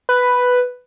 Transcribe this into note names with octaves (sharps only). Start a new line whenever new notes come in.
B4